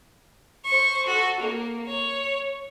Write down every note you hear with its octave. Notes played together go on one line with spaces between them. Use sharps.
C5 C#6
F#4 A4
A#3
C#5